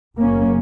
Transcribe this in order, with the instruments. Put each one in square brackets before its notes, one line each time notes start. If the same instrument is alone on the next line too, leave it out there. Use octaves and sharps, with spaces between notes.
[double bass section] F#1 F#2 C#3 A#3 C#4